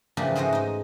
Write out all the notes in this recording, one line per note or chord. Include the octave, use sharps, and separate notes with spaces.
C#3 E3 F3 A#3 D4 G4
G#2 G#3 A3 F#4 C5 D#5
D#4 D#5